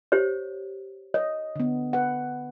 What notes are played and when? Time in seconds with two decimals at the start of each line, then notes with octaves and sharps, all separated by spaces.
0.12 G4 C5 C#5
1.14 C#5 D#5
1.56 D3 B3
1.93 B4 F#5